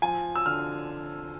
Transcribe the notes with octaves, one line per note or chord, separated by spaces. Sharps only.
F3 G#5
E6
D3 F6